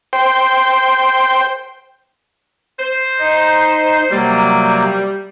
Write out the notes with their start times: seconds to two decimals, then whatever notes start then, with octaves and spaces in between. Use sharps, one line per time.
0.13 C5 G5
2.80 C5
3.18 D#4
4.11 C3 F#3 G3 A#3